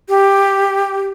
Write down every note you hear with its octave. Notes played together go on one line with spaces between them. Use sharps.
G4